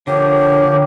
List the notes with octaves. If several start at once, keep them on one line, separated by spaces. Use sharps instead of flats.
D3 F3 A#3 G4 C#5